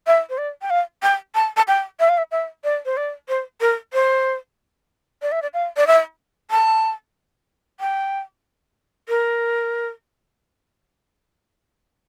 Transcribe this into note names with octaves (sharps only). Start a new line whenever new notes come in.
E5
C5
D5
G5
F5
G5
A5
A5
G5
E5
F5
E5
E5
D5
C5
D5
C5
A#4
C5
D5
E5
D5
F5
D5
E5
A5
G5
A#4